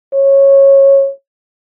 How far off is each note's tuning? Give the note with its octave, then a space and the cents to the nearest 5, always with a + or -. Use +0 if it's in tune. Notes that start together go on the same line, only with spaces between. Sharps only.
C#5 -15